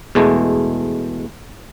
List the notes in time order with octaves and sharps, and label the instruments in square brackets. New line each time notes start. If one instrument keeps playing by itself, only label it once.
[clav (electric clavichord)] E2 B2 G#3 A3